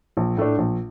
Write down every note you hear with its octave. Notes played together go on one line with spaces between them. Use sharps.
A#1
A2 A3 D4
A#1